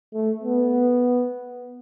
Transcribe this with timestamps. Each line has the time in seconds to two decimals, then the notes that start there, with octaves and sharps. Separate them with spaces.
0.14 A3
0.43 B3